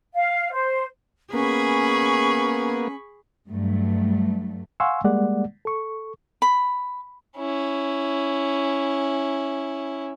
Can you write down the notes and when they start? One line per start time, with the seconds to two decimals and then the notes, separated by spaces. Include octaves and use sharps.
0.14 F5
0.52 C5
1.34 A#3 B3 C#4 G#4 B5 C#6
3.49 G2 F#3 A3
4.80 F5 F#5 G#5 C6 C#6 E6
5.04 G3 G#3 A#3 D5 F#5
5.65 A4 C#6
6.42 B5
7.37 C#4 E4